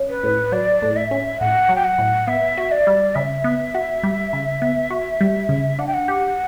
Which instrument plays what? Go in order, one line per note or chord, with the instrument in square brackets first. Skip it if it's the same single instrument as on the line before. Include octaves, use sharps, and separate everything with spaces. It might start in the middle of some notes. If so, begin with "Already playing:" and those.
Already playing: [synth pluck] C#4
[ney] B4
[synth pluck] A2
[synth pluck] F#3 [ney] D5
[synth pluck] A2
[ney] E5
[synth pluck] C#4
[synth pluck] A2 [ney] F#5
[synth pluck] F#3
[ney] G5
F#5
[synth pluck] A2
[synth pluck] B3 [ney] E5
[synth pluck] F#4
[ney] D5
[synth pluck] G3
[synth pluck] C#3 [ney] E5
[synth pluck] B3
F#4
G3
C#3
B3
F#4
G3
C#3
[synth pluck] D4 [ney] F#5
[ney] G5
F#5
[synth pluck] G4